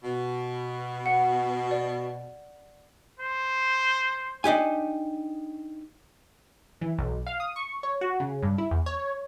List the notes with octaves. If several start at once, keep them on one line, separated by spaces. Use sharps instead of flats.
B2
F#5
D5
C5
D4 D#4 G4 G#5
E3
B1
F5
D#6
C#6
C#5
F#4
C#3
G2
E4
E2
C#5